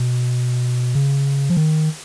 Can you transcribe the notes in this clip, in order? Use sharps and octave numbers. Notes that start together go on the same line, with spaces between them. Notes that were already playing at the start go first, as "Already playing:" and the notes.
Already playing: B2
C#3
F3
D#3